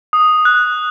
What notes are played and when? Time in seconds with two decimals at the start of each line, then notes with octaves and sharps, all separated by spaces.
0.13 D#6
0.45 F#6